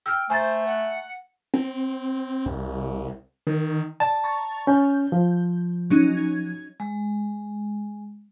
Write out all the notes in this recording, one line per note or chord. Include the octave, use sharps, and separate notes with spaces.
G5 E6 F6
A3 C5 G#5 A#5 A6
F#5
C4
C2
D#3
D5 A5
A#5 C#6 A6
C#4 G6
F3
F#3 C#4 D#4
G#6
G#3